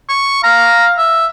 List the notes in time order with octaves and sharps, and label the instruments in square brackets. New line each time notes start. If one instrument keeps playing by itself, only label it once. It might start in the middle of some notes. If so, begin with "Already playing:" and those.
[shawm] C#6
[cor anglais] F5 [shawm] A#5
[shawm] E5